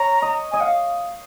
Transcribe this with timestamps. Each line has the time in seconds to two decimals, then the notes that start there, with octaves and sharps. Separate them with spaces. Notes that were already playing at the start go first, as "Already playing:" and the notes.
Already playing: C#5 A#5
0.22 D#5
0.51 D#5 G#5
0.60 F5 F#5